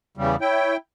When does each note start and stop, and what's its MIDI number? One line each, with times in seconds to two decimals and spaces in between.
0.17 0.36 40
0.17 0.36 49
0.17 0.36 55
0.41 0.77 64
0.41 0.74 73
0.41 0.77 79